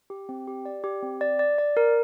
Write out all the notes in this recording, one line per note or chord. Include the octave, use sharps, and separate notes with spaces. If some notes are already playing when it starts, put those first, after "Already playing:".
G4
C4
G4
D5
G4
C4
D5
D5
D5
A#4